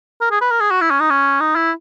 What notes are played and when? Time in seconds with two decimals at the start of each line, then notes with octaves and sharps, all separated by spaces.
0.21 A#4
0.31 G#4
0.41 B4
0.51 A#4
0.61 G#4
0.71 F#4
0.81 E4
0.90 C#4
1.00 D#4
1.10 C#4
1.40 D#4
1.55 E4